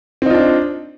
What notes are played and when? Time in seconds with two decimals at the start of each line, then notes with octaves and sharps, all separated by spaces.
0.22 C4
0.26 D#4
0.30 F4
0.34 D4